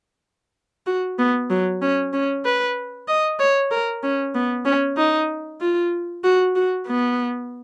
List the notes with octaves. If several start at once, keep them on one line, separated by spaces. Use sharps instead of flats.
F#4
B3
F#3
C#4
C#4
B4
D#5
C#5
A#4
C#4
B3
C#4
D#4
F4
F#4
F#4
B3